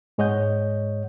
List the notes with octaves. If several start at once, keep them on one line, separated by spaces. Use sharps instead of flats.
G#2 G#3 C#5 D#5 F#5 G6